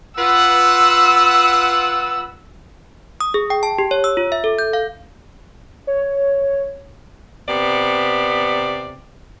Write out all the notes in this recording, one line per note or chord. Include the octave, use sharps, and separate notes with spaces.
F4 B4 F#5 E6
D#6
G#4
G5
A5
G4
C#5
E6
F4
E5
A4
G6
F5
C#5
C3 B3 D5